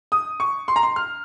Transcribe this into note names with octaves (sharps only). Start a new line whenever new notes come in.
D#6
C#6
C6
A#5
C6
F6